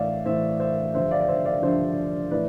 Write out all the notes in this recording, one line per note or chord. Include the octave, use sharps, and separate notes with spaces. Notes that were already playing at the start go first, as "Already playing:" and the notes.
Already playing: A2 E3 D5 E5 F5
A2 E3 C5 E5
C5 E5
G2 D3 F3 C5 E5
D5 F5
D5
C5 E5
D5 F5
G2 D3 F3 C5 E5
A2 E3 B4 D5